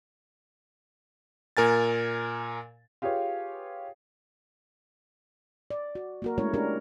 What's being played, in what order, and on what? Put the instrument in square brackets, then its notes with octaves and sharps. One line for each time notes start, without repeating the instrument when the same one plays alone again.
[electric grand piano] A#2 A#4 G#5 A6
[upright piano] F4 G4 G#4 B4 C#5 F5
[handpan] D5
F#4
A#3 F#4 A#4
G#3 A3 C#4 E4 A#4 C#5
C#4 D4 G4 A#4